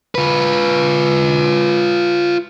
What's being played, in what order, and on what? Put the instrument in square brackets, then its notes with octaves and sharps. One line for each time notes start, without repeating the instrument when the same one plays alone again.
[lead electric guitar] F4 B4